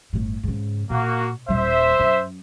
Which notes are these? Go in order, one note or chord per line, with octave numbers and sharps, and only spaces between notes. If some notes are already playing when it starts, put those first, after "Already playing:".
G1 A2
G#2 C#3
A#2 A#3 F#4
D#1 G3 C5 E5
F#2